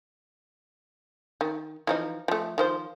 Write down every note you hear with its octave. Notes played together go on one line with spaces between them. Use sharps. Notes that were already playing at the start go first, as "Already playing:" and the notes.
D#3
E3 F3 D#4
F3 A3
D#3 F3 C5